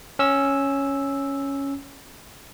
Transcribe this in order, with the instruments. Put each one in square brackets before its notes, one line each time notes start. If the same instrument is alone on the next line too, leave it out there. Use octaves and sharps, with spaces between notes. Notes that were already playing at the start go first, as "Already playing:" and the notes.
[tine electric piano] C#4 E6